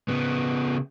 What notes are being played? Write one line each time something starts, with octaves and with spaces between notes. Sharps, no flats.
C#3 B3